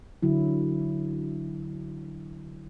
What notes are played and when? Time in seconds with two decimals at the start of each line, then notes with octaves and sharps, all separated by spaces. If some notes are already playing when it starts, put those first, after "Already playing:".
0.23 D3 F#3 E4